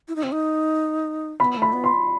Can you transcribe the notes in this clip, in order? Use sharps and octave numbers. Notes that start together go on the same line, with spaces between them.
E4
D#4
C4
D#4
B3 B5
A3 B5
B3
C6